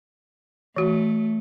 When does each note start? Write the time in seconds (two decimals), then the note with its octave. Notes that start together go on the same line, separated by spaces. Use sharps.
0.76 E3 A3 F#4